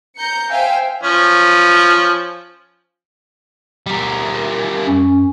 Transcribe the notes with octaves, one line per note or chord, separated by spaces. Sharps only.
A#5 G6 C#7
C5 E5 F5 G5 G#5
F3 C#4
G3 A#4
F#2 C#4 G#5